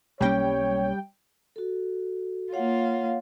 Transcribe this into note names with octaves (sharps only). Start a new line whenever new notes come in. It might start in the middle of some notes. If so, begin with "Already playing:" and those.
B1 G3 A#3 C#4 C#5 G5
F#4 A4
A#3 F4 C#5 F5 F#5